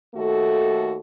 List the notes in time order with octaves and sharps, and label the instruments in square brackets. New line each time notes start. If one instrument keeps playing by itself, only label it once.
[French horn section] D#2 A3 F#4 A4